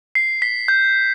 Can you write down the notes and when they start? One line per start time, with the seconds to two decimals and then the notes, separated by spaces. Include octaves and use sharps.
0.15 C7
0.42 B6
0.68 G6